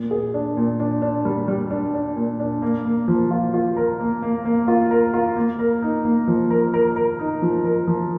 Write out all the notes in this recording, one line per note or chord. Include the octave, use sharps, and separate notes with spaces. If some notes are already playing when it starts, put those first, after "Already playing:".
Already playing: A#2
G#4
D4
A#2
D4
D4
G3
G3
D4
D4
A#2
D4
A#3
A#3
F3
F4
F4
A#4
A#3
A#3
A#3
F4
A#4
F4
A#3
A#4
D#4
A#3
F3
A#4
A#4
A#4
D#4
F3
A#4
F3